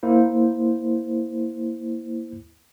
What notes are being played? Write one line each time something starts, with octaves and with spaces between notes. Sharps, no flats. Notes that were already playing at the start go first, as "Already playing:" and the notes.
A#3 E4 C5